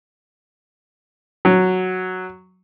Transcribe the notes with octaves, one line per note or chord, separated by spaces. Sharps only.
F#3